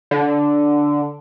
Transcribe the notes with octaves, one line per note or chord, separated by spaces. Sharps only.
D3